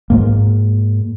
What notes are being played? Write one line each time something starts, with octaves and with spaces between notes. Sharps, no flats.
G#2 A#3